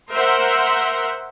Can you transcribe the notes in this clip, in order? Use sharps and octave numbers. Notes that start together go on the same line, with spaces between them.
A#4 C5 E5 F#5 C6